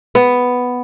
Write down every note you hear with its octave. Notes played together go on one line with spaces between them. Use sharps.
B3